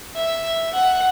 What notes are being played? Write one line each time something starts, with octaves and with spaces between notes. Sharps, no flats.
E5
F#5